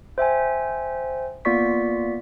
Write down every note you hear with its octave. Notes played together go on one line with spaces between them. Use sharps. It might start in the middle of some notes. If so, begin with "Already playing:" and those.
C5 E5 G5 G#5
A#3 B3 F4 D5 C#6 B6